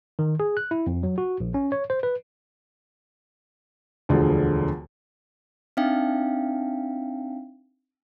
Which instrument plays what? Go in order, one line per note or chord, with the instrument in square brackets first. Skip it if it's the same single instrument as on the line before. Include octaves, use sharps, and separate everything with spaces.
[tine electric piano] D#3
G#4
F#6
E4
F2
F#3
F#4
A#1
C#4
C#5
C5
B4
[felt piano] E1 D2 D3 F3 G#4
[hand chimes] C4 D4 D#4 E5 F5 G5